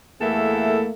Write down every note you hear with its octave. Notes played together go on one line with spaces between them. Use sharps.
E2 A3 A#3 E4 A4